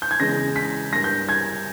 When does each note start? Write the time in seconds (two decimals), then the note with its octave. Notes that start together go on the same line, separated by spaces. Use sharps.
0.02 G6
0.11 G#6
0.20 E2 C#3 G#3 A#6
0.56 B6
0.92 G2 G3 A#3 A#6
1.04 G6
1.29 G#6